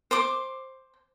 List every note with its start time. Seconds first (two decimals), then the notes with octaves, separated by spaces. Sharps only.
0.11 C5 C6 D6